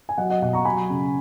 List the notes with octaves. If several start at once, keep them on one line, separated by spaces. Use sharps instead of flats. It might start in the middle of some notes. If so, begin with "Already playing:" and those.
G#5
F#3 D#5 F#5
D#5 F#5
B2 D#5 F#5
A#5 C#6
F#3 G#5 B5
C#3